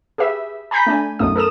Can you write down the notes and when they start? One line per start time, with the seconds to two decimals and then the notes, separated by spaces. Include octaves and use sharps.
0.18 G4 G#4 B4 E5
0.71 G#5 A#5 B5 G6 A#6 B6
0.87 A3 D4 G#5
1.19 B1 F#2 A3 D#4 D#6
1.36 A4 A#4 D#6 E7